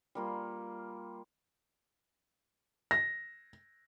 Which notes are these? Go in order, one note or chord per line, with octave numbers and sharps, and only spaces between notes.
G3 A#3 F4
A#6